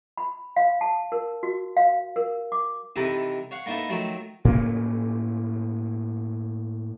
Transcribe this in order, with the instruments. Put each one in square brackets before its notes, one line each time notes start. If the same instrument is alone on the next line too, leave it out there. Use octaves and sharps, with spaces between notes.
[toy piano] B5
F5
A5
A#4
F#4
F5
A#4
D6
[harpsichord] C3 D#3 E3 D#4 A4 B4
C#5 F5 F#5
A#3 B3 D#4 E4 A4
D#3 F3 F#3 A3
[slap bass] A2 A#3 C#4